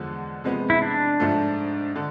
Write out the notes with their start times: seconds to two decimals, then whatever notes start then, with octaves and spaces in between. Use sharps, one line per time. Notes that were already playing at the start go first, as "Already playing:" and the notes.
Already playing: E2 D3 F3 G#3
0.44 C3 F3 G#3 B3
0.70 E4
0.82 D4
1.20 G#2 F3 A3
1.96 D3